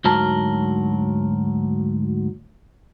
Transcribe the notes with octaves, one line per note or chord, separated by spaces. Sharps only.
D2 G#2 F#3 A#4 A5